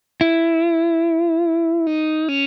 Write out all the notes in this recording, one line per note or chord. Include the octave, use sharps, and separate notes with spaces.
E4
D#4
C#4